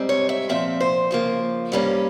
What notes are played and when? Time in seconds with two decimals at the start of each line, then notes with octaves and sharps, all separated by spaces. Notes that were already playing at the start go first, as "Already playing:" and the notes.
Already playing: G#2 G3 C4
0.09 C#5
0.29 E5
0.49 A#2 F3 C4 E5
0.80 C5
1.11 C#3 F3 A#3
1.72 G2 G3 A#3 C#4